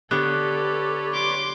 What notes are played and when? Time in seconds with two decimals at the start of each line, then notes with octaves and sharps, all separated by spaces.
0.11 D3 B3 G4 A4 B4 C#5 D5
1.13 C6 D6